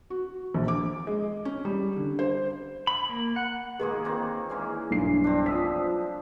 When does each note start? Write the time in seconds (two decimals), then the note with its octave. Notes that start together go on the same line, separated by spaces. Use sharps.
0.10 F#4
0.54 A#1
0.68 D6
1.07 G#3
1.45 C#4
1.65 G3
1.96 D3
2.19 C5
2.87 B5
3.09 A#3
3.36 F#5
3.79 D#3 G#3 A#3 G#4 B4
4.04 D#3 A#3 C4
4.50 E3 G#3 C#4
4.91 B1 G2 C7
5.24 C4 D4
5.46 F3 D#6 E6 B6